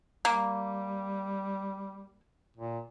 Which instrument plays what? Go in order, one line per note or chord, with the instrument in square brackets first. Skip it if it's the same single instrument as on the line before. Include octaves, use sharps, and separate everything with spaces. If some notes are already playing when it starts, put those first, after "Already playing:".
[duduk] G3 [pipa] A#3
[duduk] A#2